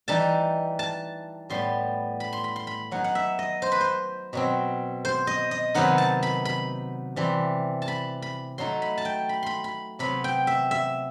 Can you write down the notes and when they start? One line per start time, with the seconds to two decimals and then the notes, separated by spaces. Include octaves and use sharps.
0.08 E3 G3 D#4 A5
0.79 A5
1.50 A2 G3 B3 C6
2.20 B5
2.33 C6
2.44 B5
2.56 C6
2.67 B5
2.91 F#3 B3 D#4 F#5
3.04 F#5
3.15 E5
3.39 D#5
3.62 C5
3.72 B4
3.81 C5
4.33 B2 F#3 C4
5.05 C5
5.27 D#5
5.51 D#5
5.74 C3 D#3 F#3 B3 D#4 F#5
5.98 A5
6.23 B5
6.45 B5
7.16 C3 E3 G3
7.82 A5
7.88 B5
8.22 B5
8.58 F#3 A3 D#4 C6
8.82 B5
8.98 A5
9.05 G5
9.29 B5
9.43 B5 C6
9.64 B5
9.99 C3 F#3 B3 B5
10.24 G5
10.47 E5
10.71 E5